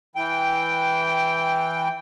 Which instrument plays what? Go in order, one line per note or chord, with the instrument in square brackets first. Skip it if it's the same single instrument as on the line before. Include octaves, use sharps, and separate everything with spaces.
[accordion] E3 G5